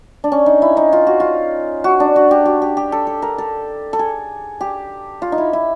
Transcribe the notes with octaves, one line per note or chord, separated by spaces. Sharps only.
D4
C#4
D#4
E4
D#4
F4
F#4
F4
F#4
D4
F#4
G4
F#4
G4
G4
A4
A4
A#4
A4
A4
G#4
G4
F4
D#4
E4
E4